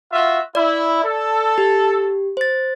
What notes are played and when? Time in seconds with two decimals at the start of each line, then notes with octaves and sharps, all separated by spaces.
0.12 F4 F#4 E5
0.55 E4 D5
1.03 A4
1.58 G4
2.37 C5 A6